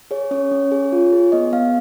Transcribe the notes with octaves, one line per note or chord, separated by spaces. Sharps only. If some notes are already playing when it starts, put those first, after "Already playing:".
G#4 C#5
C#4 C#5
C#4
G#4
F4
G#4
B3 D#5
B3 F5